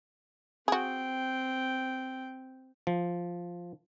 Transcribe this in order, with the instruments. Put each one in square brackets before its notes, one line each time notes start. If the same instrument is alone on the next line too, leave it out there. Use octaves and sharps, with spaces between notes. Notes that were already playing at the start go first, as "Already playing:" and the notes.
[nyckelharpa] C4 G5 [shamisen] F#4 G#4
[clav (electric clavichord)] F3